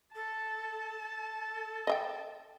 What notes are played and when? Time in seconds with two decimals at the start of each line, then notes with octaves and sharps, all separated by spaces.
0.14 A4 A5
1.00 A4
1.87 D#5 E5 G5